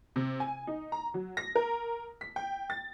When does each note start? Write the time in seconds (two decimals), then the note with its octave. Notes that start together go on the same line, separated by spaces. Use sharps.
0.16 C3
0.40 G#5
0.67 D#4
0.92 A#5
1.14 F#3
1.37 A#6
1.56 A#4
2.21 B6
2.36 G5
2.70 A6